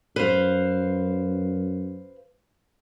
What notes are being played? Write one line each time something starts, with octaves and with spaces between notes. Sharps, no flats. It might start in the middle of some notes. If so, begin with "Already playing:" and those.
F#2 B4 C5 F5